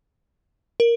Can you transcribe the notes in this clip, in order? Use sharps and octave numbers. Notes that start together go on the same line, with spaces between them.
A#4